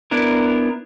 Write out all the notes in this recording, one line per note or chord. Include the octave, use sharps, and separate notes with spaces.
B3 D4 E4 A#4